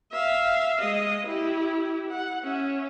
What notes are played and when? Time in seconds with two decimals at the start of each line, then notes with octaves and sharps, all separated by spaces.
0.12 E5 F5
0.80 G#3 D#5
1.26 E4 G4
2.10 F#5
2.43 C#4 E5